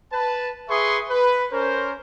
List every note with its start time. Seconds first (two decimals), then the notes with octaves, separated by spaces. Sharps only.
0.12 B4 A5
0.69 G#4 B4 E5 C6 C#6 D#6
1.10 B4
1.52 C#4 A#4 C5